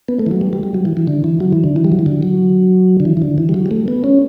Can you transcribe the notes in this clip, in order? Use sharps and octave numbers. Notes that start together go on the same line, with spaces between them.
B3
A3
E3
F#3
G3
G3
G3
F#3
E3
E3
D3
E3
F#3
E3
D3
E3
G3
F#3
E3
D3
F#3
D3
E3
E3
D3
E3
G3
F#3
G3
A3
B3
C#4